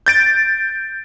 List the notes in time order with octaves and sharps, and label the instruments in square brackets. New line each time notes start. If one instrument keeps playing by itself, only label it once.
[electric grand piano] G6 A6 D7